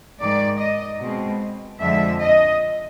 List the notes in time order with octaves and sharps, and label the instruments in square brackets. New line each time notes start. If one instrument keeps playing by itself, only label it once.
[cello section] G#2 D#3 G#3 D5
D#5
B2 G#3 C4
F2 D3 F3 G#3 E5
D#5